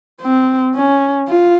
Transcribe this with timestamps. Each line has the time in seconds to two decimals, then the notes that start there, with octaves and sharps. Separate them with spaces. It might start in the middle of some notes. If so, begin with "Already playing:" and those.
0.22 C4
0.75 C#4
1.29 F4